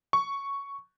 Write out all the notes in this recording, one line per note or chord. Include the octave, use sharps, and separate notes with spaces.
C#6